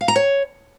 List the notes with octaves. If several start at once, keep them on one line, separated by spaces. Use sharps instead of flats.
F5
A#5
C#5